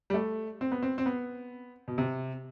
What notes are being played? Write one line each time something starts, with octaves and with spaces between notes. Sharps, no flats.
G3
A3
C4
B3
C4
C4
B3
B2
C3